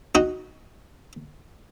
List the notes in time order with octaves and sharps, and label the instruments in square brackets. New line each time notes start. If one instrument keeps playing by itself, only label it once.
[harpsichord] D#4 F#4